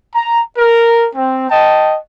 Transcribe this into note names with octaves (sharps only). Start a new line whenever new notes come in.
A#5
A#4
C4
D#5 G5 A5